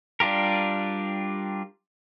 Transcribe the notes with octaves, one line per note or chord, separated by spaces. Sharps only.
G3 D4 F4 G4 A#4